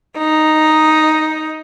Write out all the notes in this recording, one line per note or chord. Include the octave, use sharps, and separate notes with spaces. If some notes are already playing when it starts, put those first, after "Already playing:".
D#4